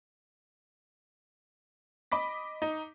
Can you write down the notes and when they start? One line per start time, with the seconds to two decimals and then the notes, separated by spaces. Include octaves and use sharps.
2.12 D#5 B5 D6 B6
2.62 D#4